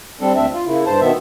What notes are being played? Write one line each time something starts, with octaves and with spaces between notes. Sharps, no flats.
G3 C4 D4 A4
D2 C4 D4 E5
F4
C#3 A#3 E4
G2 C5 A5
B2 D#3 B3 E5